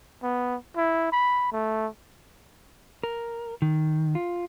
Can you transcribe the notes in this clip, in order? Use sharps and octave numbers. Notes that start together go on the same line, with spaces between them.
B3
E4
B5
A3
A#4
D#3
F4